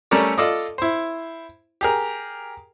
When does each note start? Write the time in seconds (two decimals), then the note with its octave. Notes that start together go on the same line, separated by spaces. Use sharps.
0.11 G3 A3 C#4 A4 A#4 D5
0.38 F4 A4 D5 D#5
0.78 E4 C5
1.81 G4 G#4 A#4